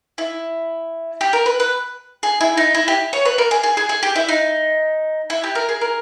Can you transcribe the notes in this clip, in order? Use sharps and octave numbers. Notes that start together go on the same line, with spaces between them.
E4
G4
A#4
B4
B4
G#4
E4
D#4
E4
G4
C#5
B4
A#4
G#4
G#4
G#4
G#4
G4
E4
D#4
E4
G4
A#4
G#4
A#4